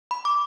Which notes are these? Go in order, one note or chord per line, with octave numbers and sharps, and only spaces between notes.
B5
D6